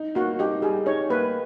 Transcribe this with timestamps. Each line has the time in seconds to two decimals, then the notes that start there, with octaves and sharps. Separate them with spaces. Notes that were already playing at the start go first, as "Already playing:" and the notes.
Already playing: D#4
0.15 A#3 F#4
0.39 D#4 G4
0.62 G3 G#4
0.86 D#4 C#5
1.10 A#3 B4